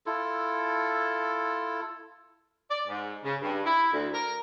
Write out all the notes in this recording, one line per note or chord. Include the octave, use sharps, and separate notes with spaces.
E4 F4 A4
D5
G#2
C#3
G2
E4
D2
A#4